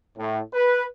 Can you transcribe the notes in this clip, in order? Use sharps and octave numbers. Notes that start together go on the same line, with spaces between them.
A2
B4